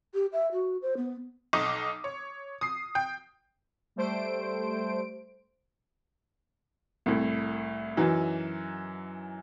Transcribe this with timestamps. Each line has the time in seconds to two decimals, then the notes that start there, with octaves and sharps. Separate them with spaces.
0.14 G4
0.33 E5
0.52 F#4
0.82 C5
0.97 B3
1.53 B1 D#4 D6 D#6
2.04 C#5
2.61 D#6 C7
2.95 G5
3.96 G3 A3 C5 D7
7.06 C2 A2
7.97 F#2 E3 F#3 D#4